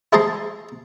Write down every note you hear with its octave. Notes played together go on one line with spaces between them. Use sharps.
E4 G#4 C5 A5 A#5 C6